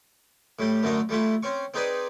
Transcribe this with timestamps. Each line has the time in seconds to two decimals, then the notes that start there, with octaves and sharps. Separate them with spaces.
0.59 A2 G3 G4
0.83 F#2 D3 A3 A#3 D#5
1.09 G3 A3 E4 F4
1.43 C4 C#4 C#6
1.74 C4 D#4 G#4 B4 D5 D#6